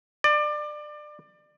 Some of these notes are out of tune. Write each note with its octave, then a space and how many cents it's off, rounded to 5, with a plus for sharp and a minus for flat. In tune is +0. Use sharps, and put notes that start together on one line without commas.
D5 +25